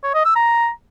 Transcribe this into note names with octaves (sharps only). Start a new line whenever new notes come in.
C#5
D#5
E6
A#5